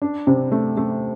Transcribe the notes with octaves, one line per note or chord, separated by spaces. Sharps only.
D4
C3
A3
A3